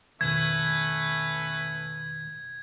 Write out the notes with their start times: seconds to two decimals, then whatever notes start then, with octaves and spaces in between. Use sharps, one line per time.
0.21 F2 B2 D#3 A3 C#4 B4 G#6